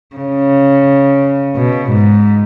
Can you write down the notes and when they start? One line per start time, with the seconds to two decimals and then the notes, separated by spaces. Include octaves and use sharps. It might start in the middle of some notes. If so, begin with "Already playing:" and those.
0.16 C#3
1.56 B2
1.91 G#2